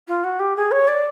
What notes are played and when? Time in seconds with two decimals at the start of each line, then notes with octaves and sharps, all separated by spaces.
0.07 F4
0.24 F#4
0.39 G4
0.56 G#4
0.71 C#5
0.87 D5